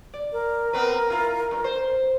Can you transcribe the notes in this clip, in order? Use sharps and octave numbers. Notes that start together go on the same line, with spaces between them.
D5
A#4
B3 C4 B4
E4 F4
G2
C5